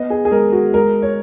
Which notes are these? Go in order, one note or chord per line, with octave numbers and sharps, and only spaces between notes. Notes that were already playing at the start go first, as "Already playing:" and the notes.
Already playing: B3 D#5
G#4
G#4
G#3 A#4
F#4
G#3 A#4
C#5